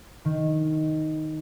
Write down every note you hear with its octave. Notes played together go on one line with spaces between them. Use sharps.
D#3